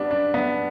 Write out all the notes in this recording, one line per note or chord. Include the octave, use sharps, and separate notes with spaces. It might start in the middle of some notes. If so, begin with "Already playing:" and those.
Already playing: G3 B3 D4
D4
B3